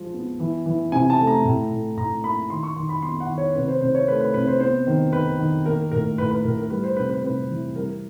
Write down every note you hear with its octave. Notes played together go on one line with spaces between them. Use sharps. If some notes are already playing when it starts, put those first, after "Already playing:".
Already playing: F3 G#3
B3
E3
E3
C3 G#5
A5
A3
A#5
A2
A2
A2 A#5
A#3 B5
D#3 C6
C#6
D#3 C6
B5
B3 C6
F#5
D#3
C#5
C3 B4
C5
C3 C5
C#5
A3 B4
B4
C3 B4
C5
B3 C5
D#3
D#3 B4
D#3
A#3 A#4
A2 A#4
A2 B4
B4
A2 A#4
A#4
G3 B4
C5
C3 B4
B4
C3 B4
E3
G3 A#4